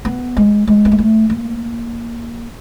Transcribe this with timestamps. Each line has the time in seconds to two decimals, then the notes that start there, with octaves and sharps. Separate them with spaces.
0.05 B3
0.37 G#3
0.67 G#3
0.85 B3
0.92 A#3
0.99 A3
1.30 A#3